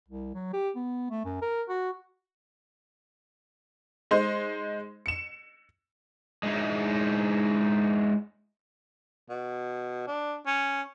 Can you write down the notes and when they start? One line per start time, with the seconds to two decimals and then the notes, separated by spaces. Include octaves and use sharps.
0.08 C2
0.35 F#3
0.53 G4
0.76 B3
1.11 A3
1.25 F#2
1.42 A#4
1.69 F#4
4.11 G#3 D#4 C5
5.06 C#7 E7
6.43 G#3 D#4 E4
9.29 B2
10.07 D4
10.47 C#4